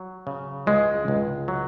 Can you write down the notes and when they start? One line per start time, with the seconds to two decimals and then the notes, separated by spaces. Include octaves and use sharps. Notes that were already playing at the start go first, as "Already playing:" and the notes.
Already playing: F#3
0.27 C#3
0.67 C#2 G#3
1.08 C#2
1.48 F#3